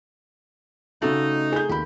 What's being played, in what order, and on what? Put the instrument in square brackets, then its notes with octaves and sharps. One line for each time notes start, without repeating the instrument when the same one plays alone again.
[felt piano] C#3 F#4 [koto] A3 D5 [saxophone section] D#4
[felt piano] G#4 G6
[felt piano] D#2 B5 [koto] G4